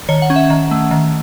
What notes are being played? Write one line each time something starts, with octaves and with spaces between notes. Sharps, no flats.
D#3 C#5
F#5
C#4
E5
D#3
A3
D#3